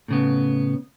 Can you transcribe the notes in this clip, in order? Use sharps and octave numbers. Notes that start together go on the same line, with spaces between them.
A2 C#3 B3